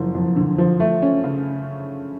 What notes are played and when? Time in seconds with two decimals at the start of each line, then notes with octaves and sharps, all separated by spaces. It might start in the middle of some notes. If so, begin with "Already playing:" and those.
Already playing: F#1 F3
0.15 F2
0.36 D3
0.58 F3
0.80 A3
1.02 C#4
1.24 C#3